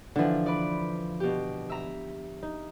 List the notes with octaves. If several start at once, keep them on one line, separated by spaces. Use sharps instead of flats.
D3 E3 F3 D4
B4 D5
B2 G4
E5 A#5
D#4